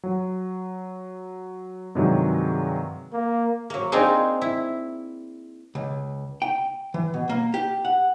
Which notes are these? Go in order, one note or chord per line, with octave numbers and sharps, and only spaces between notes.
F#3
G2 C3 D#3 F#3 G#3 G4
A#3
F#3 A#3
C4 D4 D#4 F4 G#4 A#4
E4
C#2
G5
E3
B2
A#3
G4
F#5